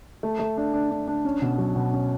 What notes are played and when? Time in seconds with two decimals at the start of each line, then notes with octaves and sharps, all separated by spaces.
0.23 A3
0.39 A3
0.57 D4
0.74 D4
0.91 D4
1.08 D4
1.25 C#4
1.42 B2
1.58 F#3
1.76 B2
1.93 C#4